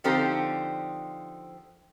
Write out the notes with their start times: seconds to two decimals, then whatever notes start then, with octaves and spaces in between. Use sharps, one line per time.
0.04 D3 F3 C4 D#4 G4 A4